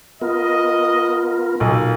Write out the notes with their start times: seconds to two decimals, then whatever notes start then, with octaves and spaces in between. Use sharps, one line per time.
0.21 B3 F4 A#4 D#5
1.60 B1 A#2